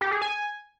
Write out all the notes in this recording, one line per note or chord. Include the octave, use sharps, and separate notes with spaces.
G4
G#4
G#5